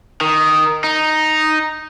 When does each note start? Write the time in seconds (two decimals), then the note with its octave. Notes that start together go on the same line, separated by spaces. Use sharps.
0.21 D#3
0.84 D#4